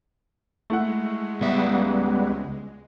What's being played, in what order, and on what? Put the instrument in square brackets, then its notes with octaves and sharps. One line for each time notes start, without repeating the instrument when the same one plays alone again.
[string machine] G#3 [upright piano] A3 E4 F#5
[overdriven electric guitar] C#2 E5 [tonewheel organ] G3 B3